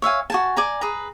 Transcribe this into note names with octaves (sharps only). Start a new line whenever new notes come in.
C#5 E5 F5 G#5
F#4 G#5 A5
D5 G#5 A#5
G#4 B4 A#5